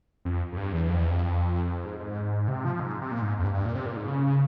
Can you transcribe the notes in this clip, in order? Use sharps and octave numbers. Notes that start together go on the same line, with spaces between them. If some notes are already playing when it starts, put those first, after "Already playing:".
F2
F2
G2
E2
F2
E2
F2
G#2
G#2
C3
F3
G#2
C3
A#2
G#2
F2
G2
G2
A#2
C3
A#2
G#2
C#3